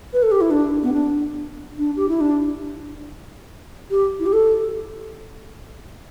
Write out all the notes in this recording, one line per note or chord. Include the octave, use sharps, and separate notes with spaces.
B4
A4
G4
E4
D4
B3
D4
D4
G4
E4
D4
G4
E4
G4
A4